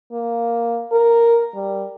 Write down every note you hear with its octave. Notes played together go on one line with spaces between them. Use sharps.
A#3
A#4
G3